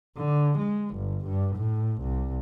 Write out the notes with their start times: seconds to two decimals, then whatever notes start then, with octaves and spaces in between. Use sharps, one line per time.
0.17 D3
0.59 G#3
0.96 G1
1.26 G2
1.57 A2
2.02 C2